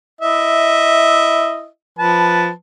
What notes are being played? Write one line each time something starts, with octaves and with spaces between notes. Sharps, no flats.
E4 D#5 E5
F3 B4 A5